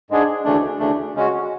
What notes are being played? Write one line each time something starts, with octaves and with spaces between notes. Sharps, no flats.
G#2 G#3 D4 G#4
D2 C#3 E3 A3 D4
D2 C#3 E3 A3 D4
C#3 G#3 C#4 F#4